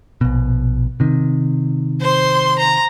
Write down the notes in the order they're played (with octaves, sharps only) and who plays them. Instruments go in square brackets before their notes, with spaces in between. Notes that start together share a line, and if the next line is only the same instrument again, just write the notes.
[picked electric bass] A#1 B2
C3 D#3
[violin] C5 C6
A#5